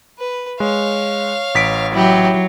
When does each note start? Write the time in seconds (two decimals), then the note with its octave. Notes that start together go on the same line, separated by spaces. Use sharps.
0.19 B4
0.60 G#3 C#5 F5
1.55 A1 B6 D7
1.94 F#3 E4 G4